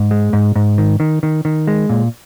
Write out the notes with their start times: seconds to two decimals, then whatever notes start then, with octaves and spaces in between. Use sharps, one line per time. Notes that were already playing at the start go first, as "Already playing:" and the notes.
Already playing: G#2
0.11 G#3
0.33 G#2
0.56 G#2
0.78 D#3
1.00 D#3
1.23 D#3
1.45 D#3
1.67 G#3
1.89 A#2